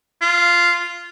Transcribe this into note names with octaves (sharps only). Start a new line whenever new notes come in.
F4